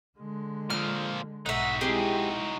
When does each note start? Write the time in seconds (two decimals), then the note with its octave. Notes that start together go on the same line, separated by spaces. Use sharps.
0.19 D3 G#3
0.70 A#2 F3 F6
1.46 B1 G#2 D#4 F#4 E5 F#5
1.81 G#3 C4 E4 G4 G#4